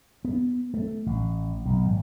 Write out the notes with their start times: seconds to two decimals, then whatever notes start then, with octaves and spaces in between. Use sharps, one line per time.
0.25 B3
0.74 A3
1.06 A1
1.65 B1
1.85 G#1